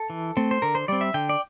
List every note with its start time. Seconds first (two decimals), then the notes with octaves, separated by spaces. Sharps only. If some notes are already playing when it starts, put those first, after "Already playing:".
Already playing: A4
0.10 E3
0.37 A3 C4
0.51 C5
0.62 D3 A#4
0.75 C5
0.88 G3 C4 D5
1.01 E5
1.14 D3 G5
1.29 D5